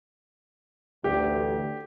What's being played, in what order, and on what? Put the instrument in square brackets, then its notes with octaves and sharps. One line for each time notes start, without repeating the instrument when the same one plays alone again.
[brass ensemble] A1 D2 [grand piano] G4